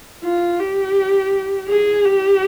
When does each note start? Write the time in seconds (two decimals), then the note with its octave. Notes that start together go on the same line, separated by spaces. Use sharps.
0.24 F4
0.59 G4
1.68 G#4
2.05 G4